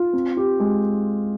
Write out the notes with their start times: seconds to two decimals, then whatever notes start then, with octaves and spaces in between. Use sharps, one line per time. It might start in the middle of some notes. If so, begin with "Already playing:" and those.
Already playing: F4
0.13 C4
0.37 G4
0.60 G#3